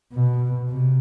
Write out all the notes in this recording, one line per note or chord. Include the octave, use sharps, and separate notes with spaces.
B2
C3